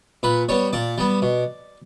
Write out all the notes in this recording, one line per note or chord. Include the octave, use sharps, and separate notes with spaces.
A#2 B4
G3 B3 C#5
A#2 D5
G3 B3
B2